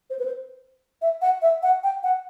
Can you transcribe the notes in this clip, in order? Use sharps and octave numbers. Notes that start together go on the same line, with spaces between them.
C5
B4
C5
E5
F#5
E5
F#5
G5
F#5